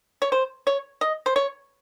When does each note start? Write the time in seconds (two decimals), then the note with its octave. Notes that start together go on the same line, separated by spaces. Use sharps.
0.22 C#5
0.32 C5
0.67 C#5
1.01 D#5
1.26 C5
1.36 C#5